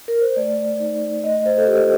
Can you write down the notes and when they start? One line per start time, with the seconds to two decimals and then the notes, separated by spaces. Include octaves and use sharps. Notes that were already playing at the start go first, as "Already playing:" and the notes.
0.08 A#4
0.21 C5
0.36 A3 D5
0.80 D#4
1.24 A3 D#5
1.46 C5
1.58 A4
1.67 D4 F4 G4